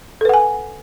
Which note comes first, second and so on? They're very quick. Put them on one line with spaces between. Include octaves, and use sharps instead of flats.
A4 B4 F#5 G#5